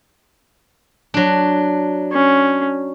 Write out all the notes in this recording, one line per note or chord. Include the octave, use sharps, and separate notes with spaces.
F#3 D4
C#4